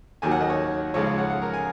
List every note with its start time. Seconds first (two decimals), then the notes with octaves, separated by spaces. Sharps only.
0.22 D#2 D#3 F#3 G#5
0.31 F#5
0.40 D#5
0.50 C#5
0.94 C#2 C#3 F3 G#3 C#5
1.06 F5
1.18 F#5
1.30 F#5
1.42 A#4
1.53 G#5